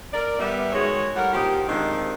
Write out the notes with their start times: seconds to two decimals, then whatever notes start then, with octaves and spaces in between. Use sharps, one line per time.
0.13 A#4 D5
0.39 G3 B3 E5
0.72 D#3 G#3 F#4 G#4 C#5
1.16 A2 G3 A#4 F#5
1.33 A#2 F3 D#4 G4
1.68 C3 D#3 F3 G#3 C4 D4